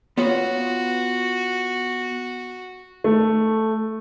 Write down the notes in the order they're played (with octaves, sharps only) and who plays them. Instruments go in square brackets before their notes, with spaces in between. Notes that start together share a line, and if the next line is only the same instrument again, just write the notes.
[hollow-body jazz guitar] B3 F4 C#5 [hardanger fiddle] F#4
[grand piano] A3